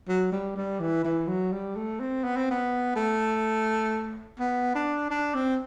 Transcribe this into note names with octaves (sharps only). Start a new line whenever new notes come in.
F#3
G3
G3
E3
E3
F#3
G3
A3
C4
B3
C4
B3
A3
B3
D4
D4
C4